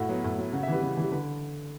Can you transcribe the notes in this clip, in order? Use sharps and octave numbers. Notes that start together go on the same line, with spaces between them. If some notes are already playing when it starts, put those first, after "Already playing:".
Already playing: A2 F#4
F#3 B3
A2
F#3 B3
C#3 F#4
E5
E3 G3 B4
C#3
E3 G3
D3 B4